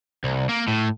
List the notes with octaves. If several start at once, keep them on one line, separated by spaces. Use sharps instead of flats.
C2
A#3
A2